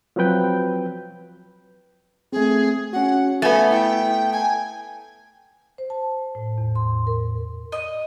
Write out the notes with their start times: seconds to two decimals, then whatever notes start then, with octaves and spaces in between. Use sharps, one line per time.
0.16 F3 F#3 C4 B4 G5
2.33 A3 C4 G#4
2.93 C#4 F#4 F#5
3.42 A3 B3 G#5 A6
3.71 E4 G5
4.33 G#5 A5
5.78 C5
5.90 A5
6.35 A2
6.58 E2
6.75 C6
7.07 A#4
7.72 D#5